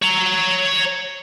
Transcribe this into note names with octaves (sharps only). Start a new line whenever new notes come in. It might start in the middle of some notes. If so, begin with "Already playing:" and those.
C#5 A#5